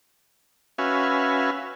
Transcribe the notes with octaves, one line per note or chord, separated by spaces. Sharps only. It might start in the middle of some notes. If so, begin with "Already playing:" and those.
C#4 F#4 B4 E5 F5 G#5